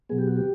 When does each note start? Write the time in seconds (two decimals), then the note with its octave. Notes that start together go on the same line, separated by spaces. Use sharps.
0.09 B2 F#3 B3 G#4
0.19 G4
0.27 F#4
0.37 G4